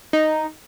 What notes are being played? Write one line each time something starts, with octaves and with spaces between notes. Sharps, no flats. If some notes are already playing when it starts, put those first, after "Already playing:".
D#4